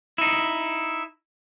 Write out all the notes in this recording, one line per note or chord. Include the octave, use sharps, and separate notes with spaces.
D#4 E4